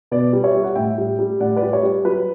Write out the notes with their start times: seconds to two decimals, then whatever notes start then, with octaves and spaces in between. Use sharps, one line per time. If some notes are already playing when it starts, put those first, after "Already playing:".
0.11 B2 B4 D5
0.33 G3
0.44 C#5 E5
0.55 G3
0.64 F#5
0.75 A2 E5 G5
0.98 G3
1.19 G3
1.40 A2 D5 F#5
1.56 B4 D5
1.62 G3
1.73 C#5
1.83 G3
2.05 F#3 B4